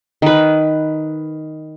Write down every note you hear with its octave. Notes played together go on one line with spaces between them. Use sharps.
D#3 B4